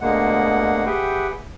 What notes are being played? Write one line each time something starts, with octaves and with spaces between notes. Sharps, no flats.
D2 B2 D3 G#3 A#3 F#5
G4 G#4 B4 E5 F#5 G5